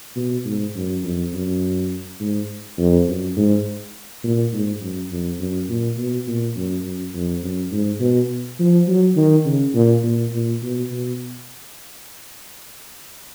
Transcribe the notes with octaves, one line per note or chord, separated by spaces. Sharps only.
B2
G#2
F#2
F2
F#2
G#2
F2
F#2
G#2
A#2
G#2
F#2
F2
F#2
A#2
B2
A#2
F#2
F#2
F2
F#2
G#2
B2
F3
F#3
D#3
C#3
A#2
A#2
A#2
B2
B2